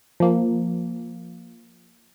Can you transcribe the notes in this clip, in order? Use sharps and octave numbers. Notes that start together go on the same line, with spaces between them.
F3 A#3